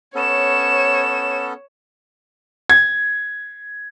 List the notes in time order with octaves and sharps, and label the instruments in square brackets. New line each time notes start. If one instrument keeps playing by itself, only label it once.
[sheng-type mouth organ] B3 C#4 A4 [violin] C#5 E7
[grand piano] G#6